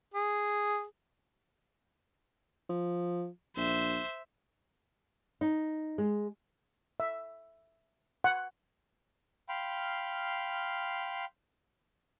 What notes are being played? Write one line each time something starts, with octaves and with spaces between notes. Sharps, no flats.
G#4
F3
A#1 C5 E5
D#4
G#3
E5
F#5
F5 G5 B5 C6 F6